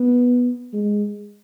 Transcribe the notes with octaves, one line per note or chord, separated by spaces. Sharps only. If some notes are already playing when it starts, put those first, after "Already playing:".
Already playing: B3
G#3